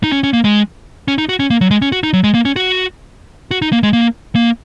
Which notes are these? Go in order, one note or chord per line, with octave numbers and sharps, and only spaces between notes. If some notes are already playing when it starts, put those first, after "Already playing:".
D#4
C#4
C#4
A#3
G#3
C#4
D#4
F#4
C#4
A#3
F#3
G#3
C#4
F#4
D#4
F#3
G#3
A#3
C#4
F#4
F#4
D#4
A#3
G#3
A#3
A#3